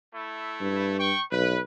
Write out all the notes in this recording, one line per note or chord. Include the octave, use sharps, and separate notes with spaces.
A3 E4
G2
G5 C#6
B1 B4